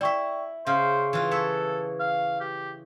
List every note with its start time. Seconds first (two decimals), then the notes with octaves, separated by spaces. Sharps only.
0.01 E4 D5 E5 G5 C#6
0.67 C#3 C5 F5 F6
1.13 E3 F4
1.31 A4 C#5 E5
2.00 F5
2.41 G4